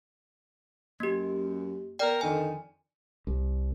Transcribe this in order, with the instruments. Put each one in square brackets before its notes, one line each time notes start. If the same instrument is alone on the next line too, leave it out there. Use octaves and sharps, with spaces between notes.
[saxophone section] F#2 [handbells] A#3 G4
[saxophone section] B3 A#4 [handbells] D5 G5
[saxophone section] F2 D3 D#3 [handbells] G#5
[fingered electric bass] C2